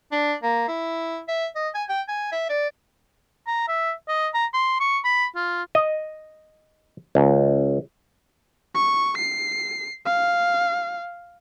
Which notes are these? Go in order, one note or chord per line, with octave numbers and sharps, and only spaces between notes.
D4
A#3
E4
E5
D#5
G#5
G5
G#5
E5
D5
A#5
E5
D#5
A#5
C6
C#6
B5
F4
D#5
C#2
C#6
C7
F5